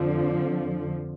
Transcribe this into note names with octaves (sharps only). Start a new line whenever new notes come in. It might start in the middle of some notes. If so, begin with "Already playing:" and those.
Already playing: F2 D3 F3